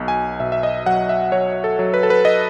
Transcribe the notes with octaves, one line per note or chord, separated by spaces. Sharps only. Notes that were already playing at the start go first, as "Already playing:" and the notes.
Already playing: B1 B2
G#5
B2 E5
E5
D#5
F#3 F#5
E5
F#3 C#5
A4
F#3
B4
A4
B4
D#5